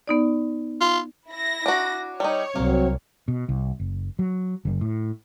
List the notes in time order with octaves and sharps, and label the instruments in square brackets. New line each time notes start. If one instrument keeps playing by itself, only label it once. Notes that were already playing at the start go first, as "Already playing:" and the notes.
[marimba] B3 D#4 D5
[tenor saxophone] F4
[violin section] E4 A#6
[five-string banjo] D4 F#4
[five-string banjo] G3 D#4 [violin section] C#5
[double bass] C2 [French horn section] F#3 C4 [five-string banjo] A#3
[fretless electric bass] B2
C2
F#1
F#3
F#1
A2